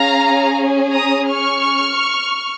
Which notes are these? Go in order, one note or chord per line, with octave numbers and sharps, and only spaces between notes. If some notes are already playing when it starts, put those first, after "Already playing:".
Already playing: C#4 G#4 F5 A#5
A#5 D#6
C#6 F6